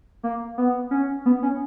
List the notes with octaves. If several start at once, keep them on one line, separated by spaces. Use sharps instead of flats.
A#3
B3
C#4
B3
C#4